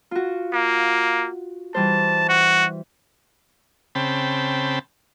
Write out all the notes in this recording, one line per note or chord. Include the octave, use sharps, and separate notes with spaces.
F4 F#4
A#3
E3 G3 C5 A5
F#4
C#3 C4 G5 A5 B5